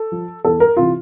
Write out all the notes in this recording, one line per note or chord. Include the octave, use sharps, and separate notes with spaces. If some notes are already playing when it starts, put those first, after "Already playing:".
Already playing: A4
F3
E2 A4
A#4
C3 E3 F4